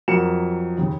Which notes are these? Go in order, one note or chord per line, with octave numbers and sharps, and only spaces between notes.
F2 F#3 A#4 C#7 E7
D#2 C#3